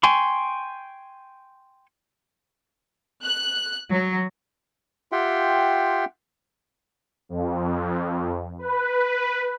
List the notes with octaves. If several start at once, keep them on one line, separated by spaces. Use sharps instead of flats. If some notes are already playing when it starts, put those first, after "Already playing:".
G5 G#5 C6 C#6
F#6
F#3
F4 G4 E5 F#5 G5 C6
F2
B4